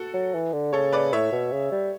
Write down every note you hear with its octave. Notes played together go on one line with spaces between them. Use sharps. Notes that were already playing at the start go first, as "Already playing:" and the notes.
Already playing: F#4 A4
F#3
E3
D3
C#3 A4 C#5
B4 D5
A2 C#5 E5
B2
C#3
G3